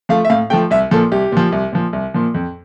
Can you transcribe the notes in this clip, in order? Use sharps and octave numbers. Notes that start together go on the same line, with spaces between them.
F3 A3 F5
E5
A2 F5
F3 A3 G5
C2 E5
A#2 F3 A4
C2 G4
A#2 F3
C2
A#2 F3
C2
A#2 F3
F2